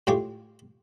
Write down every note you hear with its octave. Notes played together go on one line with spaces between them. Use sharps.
A2 G#3 F4 G4 C#5 D6